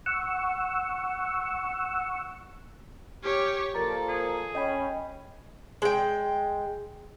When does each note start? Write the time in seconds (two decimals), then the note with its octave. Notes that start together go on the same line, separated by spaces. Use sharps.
0.06 F#5 C#6 E6
3.23 C#4 G4 C#5
3.75 A#2 F3 A4 A#4 D5 A#5
4.09 G#4
4.55 C#4 D#5 G5 B5
5.82 G#3 G5